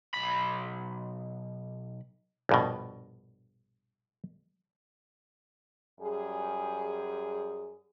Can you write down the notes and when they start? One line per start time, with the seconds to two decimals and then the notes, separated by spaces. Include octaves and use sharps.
0.14 B1 B5
2.49 A#1 G2 B2
6.01 F#2 G3 G#4